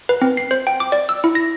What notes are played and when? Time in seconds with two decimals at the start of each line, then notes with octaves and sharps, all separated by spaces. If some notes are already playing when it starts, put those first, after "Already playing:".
0.09 B4
0.21 C4
0.37 C7
0.51 C5
0.67 G5
0.80 D6
0.92 D5
1.09 E6
1.24 E4
1.35 A#6